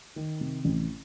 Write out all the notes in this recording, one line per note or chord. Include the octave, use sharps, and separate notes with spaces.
D#3
C3
A1